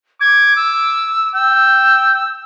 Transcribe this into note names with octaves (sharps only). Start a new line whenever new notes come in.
D6 G#6
E6
G5 E6